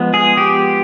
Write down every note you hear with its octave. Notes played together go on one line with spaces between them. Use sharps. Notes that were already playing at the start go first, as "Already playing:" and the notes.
Already playing: F3 G#3 B3
G#4
G4